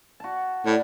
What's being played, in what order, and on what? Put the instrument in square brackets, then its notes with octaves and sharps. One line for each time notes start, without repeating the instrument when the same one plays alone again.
[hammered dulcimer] F#4 A5
[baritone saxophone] A2 [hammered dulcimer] D5